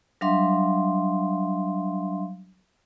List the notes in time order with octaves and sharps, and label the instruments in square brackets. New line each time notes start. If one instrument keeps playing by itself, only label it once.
[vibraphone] F#3 G3 D4 E5 F5 C6